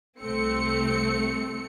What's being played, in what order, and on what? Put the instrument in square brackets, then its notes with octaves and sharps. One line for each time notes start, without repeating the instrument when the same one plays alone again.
[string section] C2 A3 C4 C#7